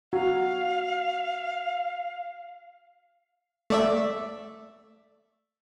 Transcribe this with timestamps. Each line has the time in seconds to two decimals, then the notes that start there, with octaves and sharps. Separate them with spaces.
0.13 F#4 F5
3.70 A3 D5 E5